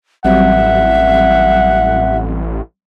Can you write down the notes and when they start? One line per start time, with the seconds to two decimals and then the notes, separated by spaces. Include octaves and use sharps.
0.25 A1 F#3 G3 C4 E5 F#5